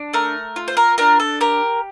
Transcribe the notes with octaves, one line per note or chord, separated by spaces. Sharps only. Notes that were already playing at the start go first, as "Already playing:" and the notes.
Already playing: D4
A3 A#4
F4
C5
A#4
D4 A#4
A4
G4 A#4